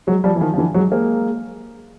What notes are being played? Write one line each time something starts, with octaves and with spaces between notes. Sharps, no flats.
F#3 G#3
F3 G3
E3
D#3 F3
F3
D3 E3
F#3 G#3
G#3 A#3